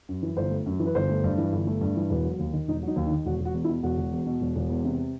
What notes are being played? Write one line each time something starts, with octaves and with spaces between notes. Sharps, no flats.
F#2
E3
G1 C5
A3
F#2
E3
B4
G1 C5
A3
G2
E3
G1
A3
G2
E3
E1 B4
F#3
D#2
D#3
E1 D#4
F#3 D#4
D#2
D#4
D#3
E1 F#4
E1
F#4
E2
E4
B2
E1 F#4
E1
E2
B2
E1
E1
E2
C3